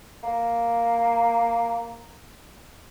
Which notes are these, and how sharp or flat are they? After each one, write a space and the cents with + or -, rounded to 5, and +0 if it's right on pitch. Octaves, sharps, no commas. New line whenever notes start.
A#3 +0